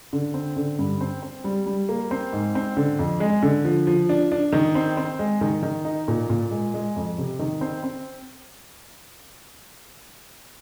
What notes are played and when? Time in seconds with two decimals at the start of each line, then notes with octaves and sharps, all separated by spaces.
0.13 D3
0.34 C4
0.56 D3
0.79 G2
1.01 C4
1.23 C4
1.44 G3
1.66 G3
1.89 A#3
2.11 C4
2.33 G#2
2.55 C4
2.77 D3
2.99 F2
3.20 G#3
3.43 D3
3.65 F3
3.87 F3
4.09 D4
4.32 D4
4.52 D#3
4.75 C4
4.97 C4
5.19 G#3
5.41 D#3
5.63 D#3
5.85 D#4
6.08 A#2
6.30 A#2
6.51 G#3
6.74 G#3
6.96 F2
7.18 C3
7.39 D#3
7.61 C4
7.84 C4